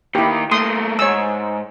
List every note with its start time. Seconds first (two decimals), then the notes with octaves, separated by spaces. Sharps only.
0.15 D#3 A#3 E4 G4
0.51 A3 A#3 C6 D#6
0.99 G#2 C#5 E6